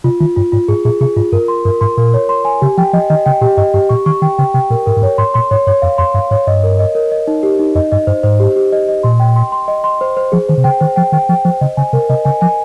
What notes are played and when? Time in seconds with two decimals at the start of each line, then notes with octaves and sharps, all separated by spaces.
0.04 C3 F4
0.20 D#3 F4
0.36 G2 F4
0.52 G#2 F4
0.68 G#2 G#4
0.85 A#2 G#4
1.01 C3 G#4
1.16 G#2 F4
1.32 G2 A#4
1.48 C6
1.65 G2 A#4
1.81 G#2 C6
1.97 A#2 A#4
2.14 C#5
2.29 C6
2.45 G#5
2.62 C#3 G4
2.78 F3 G5
2.93 F3 D#5
3.10 D#3 D#5
3.26 C#3 G5
3.41 A#2 G4
3.57 G2 D#5
3.74 G2 G4
3.89 A#2 C#6
4.06 D#3 C#6
4.22 D#3 G5
4.38 C#3 G5
4.54 C3 G5
4.70 A#2 A#4
4.86 G#2 A#4
4.96 G#2
5.02 G2 C#5
5.18 G#2 C6
5.34 A#2 C6
5.51 G#2 C#5
5.67 G2 C#5
5.82 F2 F5
5.98 F2 C6
6.14 G2 F5
6.31 G#2 C#5
6.47 G2 D#5
6.63 A#4
6.79 D#5
6.95 A#4
7.11 D#5
7.27 D#4
7.43 G4
7.59 D#4
7.75 F2 D#5
7.92 G2 D#5
8.07 G2 C5
8.23 G#2 C5
8.40 G4
8.56 G4
8.72 D#5
8.89 D#5
9.03 A#2 C6
9.20 G5
9.36 C6
9.52 C6
9.68 D#5
9.84 C6
10.01 C5
10.17 C5
10.32 F3 G#4
10.49 D#3 C5
10.58 C3
10.64 C#3 G5
10.81 D#3 C5
10.96 F3 G5
11.12 D#3 G5
11.29 F3 G5
11.45 F3 C5
11.61 C#3 D#5
11.77 C#3 G#5
11.93 C3 A#4
12.09 C3 D#5
12.25 C#3 G#5
12.41 F3 G#5